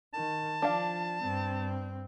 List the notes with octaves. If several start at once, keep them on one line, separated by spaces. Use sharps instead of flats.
D#3 A5
F3 D4 F5
G2 C4